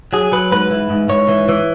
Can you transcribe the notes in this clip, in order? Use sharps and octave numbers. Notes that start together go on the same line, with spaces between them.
F#3 G#4
F#3 B4
G#2 B4
E3
G#2
G#2 C#5
E3
E3